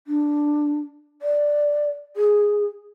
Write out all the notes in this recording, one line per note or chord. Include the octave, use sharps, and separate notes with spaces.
D4
D5
G#4